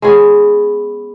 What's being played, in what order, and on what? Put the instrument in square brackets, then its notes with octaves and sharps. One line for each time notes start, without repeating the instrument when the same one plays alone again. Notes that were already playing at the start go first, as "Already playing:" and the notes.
[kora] G#3 B3 C#4 G#4